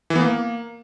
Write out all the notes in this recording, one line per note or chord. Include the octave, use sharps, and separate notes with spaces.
E3
B3
A#3